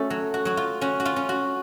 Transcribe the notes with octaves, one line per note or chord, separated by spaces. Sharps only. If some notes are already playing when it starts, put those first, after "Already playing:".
Already playing: A3 C#4 F#4 A4
F#3
F#4
F#3 F#4
F4
C#4 F#4
F#4
F4
C#4
F#4